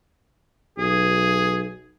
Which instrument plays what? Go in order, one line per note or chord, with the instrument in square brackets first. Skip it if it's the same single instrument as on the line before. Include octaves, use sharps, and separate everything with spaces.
[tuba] B1 [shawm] G#4